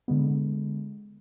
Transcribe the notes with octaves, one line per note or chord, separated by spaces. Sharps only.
D3 G#3 B3